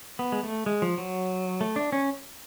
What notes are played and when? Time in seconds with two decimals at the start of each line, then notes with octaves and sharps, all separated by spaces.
0.19 B3
0.32 G#3
0.43 A3
0.66 G#3
0.82 F3
0.98 F#3
1.61 A3
1.76 D4
1.92 C#4